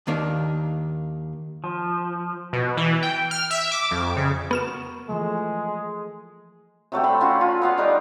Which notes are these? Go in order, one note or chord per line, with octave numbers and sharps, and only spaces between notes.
D#2 D#3 A#3 D4
F3
B2
E3
G5
F6
E5
D6
F2
C#3
B3 F#4 A#4 F6 E7
E3 F3 G#3 A3
C3 F#3 A3 G4
E5 B5 C6
C#4 F4 F#4
F4
B3 F5 F#5
D#3 G3 D#4 A#4